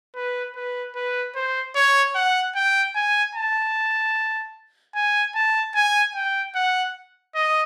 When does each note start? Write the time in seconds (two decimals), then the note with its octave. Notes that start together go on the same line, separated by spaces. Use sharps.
0.15 B4
0.55 B4
0.95 B4
1.35 C5
1.75 C#5
2.15 F#5
2.55 G5
2.95 G#5
3.35 A5
4.95 G#5
5.35 A5
5.75 G#5
6.15 G5
6.55 F#5
7.35 D#5